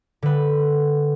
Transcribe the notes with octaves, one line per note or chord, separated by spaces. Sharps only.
D3 B4